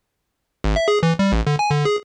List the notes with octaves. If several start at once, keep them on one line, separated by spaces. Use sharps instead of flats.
G#1
E5
G#4
E3
G3
A1
D3
G#5
D3
G#4